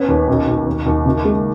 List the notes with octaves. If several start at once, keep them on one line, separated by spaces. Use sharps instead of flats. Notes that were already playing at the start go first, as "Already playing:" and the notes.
Already playing: B3 C#4
D#2
B1
B1
D#2
D#2
F#1
G#3